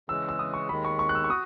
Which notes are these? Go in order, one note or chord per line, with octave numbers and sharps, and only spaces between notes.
C#3 E3 G#3 E6
E6
D#6
C#6
D#2 D#3 G#3 B5
C#6
C#6
F#6
E6
C#6
F#4 D#6